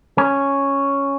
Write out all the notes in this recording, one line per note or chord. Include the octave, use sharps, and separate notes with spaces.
C#4